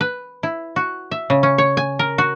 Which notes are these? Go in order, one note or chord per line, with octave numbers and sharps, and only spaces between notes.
B4
E4
F#4
E5
C#3
C#4
C#5
G#5
A#4
F#4